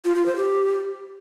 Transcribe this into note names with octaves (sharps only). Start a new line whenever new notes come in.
F4
F4
C5
G4